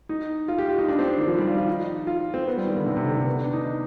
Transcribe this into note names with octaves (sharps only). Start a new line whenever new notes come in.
D#4
F4
G4
F4
D#4
D4
C4
D4
D#3
F3
G3
F4
F4
D#4
F4
C4
B3
G3
D#3
D3
C3
C3
D3
D#3
B3
D4
D#4